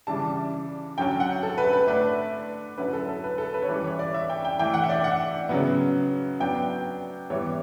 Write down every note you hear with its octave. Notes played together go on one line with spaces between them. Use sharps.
C#3 E3 G3 D4 A5
D3 F#3 C#4 G5
F#5
A4
B4
B4
D3 A3 D4 B4
D3 F#3 C#4 E4 B4
A4
A4
B4
A4
B4
C#5
E3 G3 C#4 B4
C#5
D5
E5
G5
G5
E3 A3 E4 G5
F#5
E5
D5
F#5
C#3 F#3 B3
F#3 B3 D4 G5
E3 G3 B3 E4 C#5